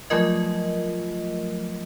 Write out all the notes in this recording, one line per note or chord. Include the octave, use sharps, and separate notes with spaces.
F3 F#3 A3 F4 A#4 D#5